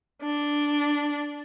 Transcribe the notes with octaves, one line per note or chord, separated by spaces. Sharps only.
D4